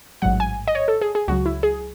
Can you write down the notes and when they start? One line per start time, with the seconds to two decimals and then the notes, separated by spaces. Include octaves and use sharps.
0.22 A1 G#2 F#3 F#5
0.40 G#5
0.68 D#5
0.75 C#5
0.88 A4
1.01 G#4
1.15 G#4
1.28 C#2 C#3 F#3 F#4
1.46 E4
1.63 G#4